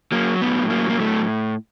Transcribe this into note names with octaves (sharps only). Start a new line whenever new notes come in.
F#3 A#3
A2 B3
F#3 A#3
A#3
A2 A3